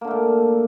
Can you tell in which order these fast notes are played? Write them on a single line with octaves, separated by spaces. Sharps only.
A#3 D3 A3 A#2